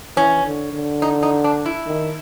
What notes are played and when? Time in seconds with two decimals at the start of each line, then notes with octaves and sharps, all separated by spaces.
0.16 E3 C#4
0.45 D3
0.73 D3
1.02 D#4
1.23 D#4
1.44 D4
1.65 E4
1.86 D#3